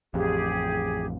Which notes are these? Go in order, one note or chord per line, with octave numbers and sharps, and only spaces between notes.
A1 F2 G4 G#4